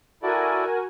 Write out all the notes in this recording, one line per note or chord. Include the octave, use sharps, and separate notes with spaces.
E4 F#4 A4 A#4 D5 G#5